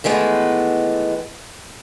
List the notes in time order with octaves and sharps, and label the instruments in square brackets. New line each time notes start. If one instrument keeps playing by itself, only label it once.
[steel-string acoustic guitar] D#3 E3 G#3 A3 B3